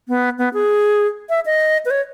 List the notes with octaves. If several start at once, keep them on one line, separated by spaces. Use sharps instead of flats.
B3
B3
G#4
E5
D#5
B4
C#5